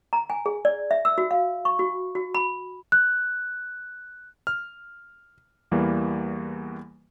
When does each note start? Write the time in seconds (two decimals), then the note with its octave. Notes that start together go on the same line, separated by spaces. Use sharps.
0.13 A#5
0.30 G#5
0.46 G#4
0.65 D5
0.91 E5
1.05 E6
1.18 F#4
1.31 F5
1.65 C#6
1.79 F#4
2.15 F#4
2.35 B5
2.92 F#6
4.47 F6
5.71 E2 E3 G3 A#3